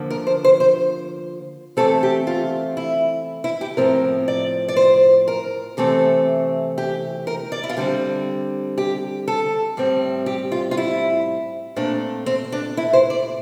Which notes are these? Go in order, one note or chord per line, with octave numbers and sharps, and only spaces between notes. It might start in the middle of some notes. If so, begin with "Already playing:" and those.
Already playing: D3 F3 A#3
A#4
C5
C5
C5
E3 A3 C4 A4
G4
F4
E4
E4
G4
A2 F3 C4 A#4
D5
D5
C5
A#4
C3 E3 A3 C4 A4
G4
A#4
D5
E4
F4
D3 G3 C4 G4
G4
A4
A2 G3 C4
G4
F4
F4
E4
A#2 A3 C4 D4
C4
D4
E4
C5
D5